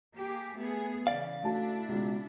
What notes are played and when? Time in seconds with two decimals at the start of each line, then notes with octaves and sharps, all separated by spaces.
0.15 A#3 G4 G#4
0.56 A3 B3 G#4
1.07 C#3 E3 D5 F5
1.43 A3 D4 E4 F#4 A5
1.89 C#2 B2